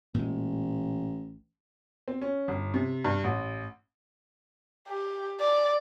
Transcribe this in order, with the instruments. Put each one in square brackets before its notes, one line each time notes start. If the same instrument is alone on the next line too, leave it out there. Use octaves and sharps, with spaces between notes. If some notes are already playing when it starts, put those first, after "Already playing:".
[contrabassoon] A1 [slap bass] A#2 G#3
[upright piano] C4
C#4
G1
C3
G2
A1
[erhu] G4
D5